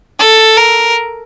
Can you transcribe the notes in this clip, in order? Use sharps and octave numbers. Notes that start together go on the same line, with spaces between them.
A4
A#4